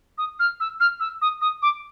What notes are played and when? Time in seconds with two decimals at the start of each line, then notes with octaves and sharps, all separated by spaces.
0.18 D#6
0.40 F6
0.60 E6
0.80 F6
1.00 E6
1.22 D#6
1.41 D#6
1.62 D6